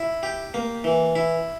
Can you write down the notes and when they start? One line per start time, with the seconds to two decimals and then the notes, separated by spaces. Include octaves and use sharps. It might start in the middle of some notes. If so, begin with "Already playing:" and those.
Already playing: E4
0.23 G4
0.54 A#3
0.84 E3
1.16 E4